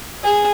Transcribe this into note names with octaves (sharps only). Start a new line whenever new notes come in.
G#4